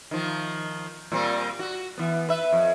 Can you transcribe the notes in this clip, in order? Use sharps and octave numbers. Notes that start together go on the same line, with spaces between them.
D#3 F3
A#2 G3 C4
F#4
E3 B3
B4 E5
F2